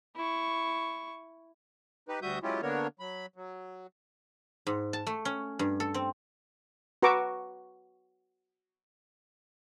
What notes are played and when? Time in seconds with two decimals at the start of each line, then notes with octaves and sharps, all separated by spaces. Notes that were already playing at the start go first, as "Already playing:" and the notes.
0.16 E4 C#6
2.08 D#4 G4 B4
2.22 D2 G3 F#4 E5 D#6 G6
2.43 F#3 G#3 C#4 E4 F4 G4
2.62 D3 A#3 B3 D4 A#4 C#5
3.00 F#3 B5
3.36 F#3
4.67 G#2
4.93 A5
5.07 A3
5.25 C#4
5.59 G2
5.80 A4
5.94 C4
7.03 F#4 B4 A#5 C#6 D6 E6